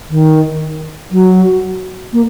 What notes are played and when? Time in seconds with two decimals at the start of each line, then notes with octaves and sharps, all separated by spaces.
0.10 D#3
1.11 F#3
2.13 A#3